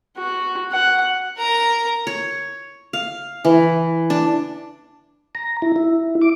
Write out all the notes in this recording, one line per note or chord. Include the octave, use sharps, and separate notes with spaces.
F#4
F#5
A#4 A#5
C#5
F5
E3
D4
A#5
E4
E4
D6